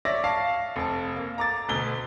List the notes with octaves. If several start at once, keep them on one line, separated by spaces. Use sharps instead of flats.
C#5 D5 E5 A#6
F5 A5 C#6 C7
F1 A5
A#3
A#5 D6 A6
D2 B2 G7